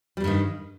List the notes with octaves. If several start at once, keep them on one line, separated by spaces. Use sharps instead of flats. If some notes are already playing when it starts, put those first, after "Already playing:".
E2 G2 D#3 G3